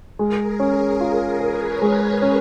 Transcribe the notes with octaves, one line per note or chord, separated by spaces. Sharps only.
G#3 G#4 A#4
C#4
F4
A#4 B4 C#5
G#3
C#4